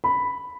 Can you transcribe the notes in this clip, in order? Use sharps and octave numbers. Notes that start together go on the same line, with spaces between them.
B5